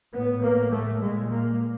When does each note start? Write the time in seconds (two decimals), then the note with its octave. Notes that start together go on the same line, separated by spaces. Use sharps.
0.13 A2 B3
0.42 A#3
0.71 A3
1.00 A#2 G#3
1.30 A#3